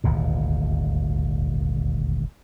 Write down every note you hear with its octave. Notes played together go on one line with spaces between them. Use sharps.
D#1 G#1 D2 A#2